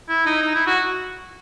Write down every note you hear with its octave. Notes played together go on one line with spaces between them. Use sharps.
E4
D#4
D#4
E4
F#4